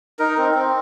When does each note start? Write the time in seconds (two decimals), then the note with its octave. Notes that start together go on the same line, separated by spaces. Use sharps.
0.19 D#4 A#4
0.37 C4
0.54 C4